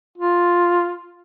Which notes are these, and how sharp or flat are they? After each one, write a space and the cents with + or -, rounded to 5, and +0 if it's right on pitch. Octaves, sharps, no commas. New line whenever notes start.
F4 +5